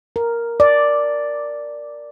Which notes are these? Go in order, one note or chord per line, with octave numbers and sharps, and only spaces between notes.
A#4
D5